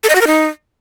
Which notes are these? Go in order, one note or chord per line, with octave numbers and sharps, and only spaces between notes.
A4
D#5
F#4
A#4
D#4